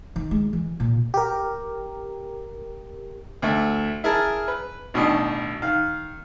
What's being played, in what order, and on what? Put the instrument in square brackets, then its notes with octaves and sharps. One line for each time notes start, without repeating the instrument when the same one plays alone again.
[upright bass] D#3
G#3
E3
A#2
[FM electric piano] G4 A#4
[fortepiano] D2 A3
E4 G#4 A#4 A5
B4
A1 B2 D#3 D4 D#5
D#3 F5